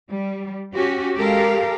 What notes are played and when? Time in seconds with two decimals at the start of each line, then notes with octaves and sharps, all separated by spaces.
0.10 G3
0.74 C#4 F#4 G4
1.16 G#3 G4 A4 A#4 F5